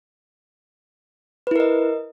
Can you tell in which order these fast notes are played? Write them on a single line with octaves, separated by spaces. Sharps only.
B4 E4 A#4 D#5